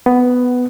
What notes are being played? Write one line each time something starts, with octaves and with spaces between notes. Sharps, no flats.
B3